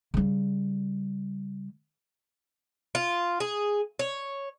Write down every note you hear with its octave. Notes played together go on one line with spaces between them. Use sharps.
C#3 G3
F4
G#4
C#5